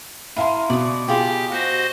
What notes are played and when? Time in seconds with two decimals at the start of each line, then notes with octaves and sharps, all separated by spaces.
0.37 E4 F5 A#5 C6 D#7
0.70 B2 D5 D#6
1.08 B2 F4 G4 G#4 G5
1.52 F#4 C5 D#5 F#5